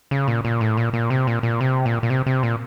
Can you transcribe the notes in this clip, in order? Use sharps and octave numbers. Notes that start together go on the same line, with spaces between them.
C#3
A#2
A#2
A2
A#2
A#2
C3
A#2
A#2
C3
A#2
A#2
C3
C3
A#2